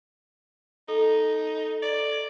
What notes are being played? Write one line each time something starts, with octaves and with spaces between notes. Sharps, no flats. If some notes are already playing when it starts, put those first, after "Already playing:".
D#4 A4
D5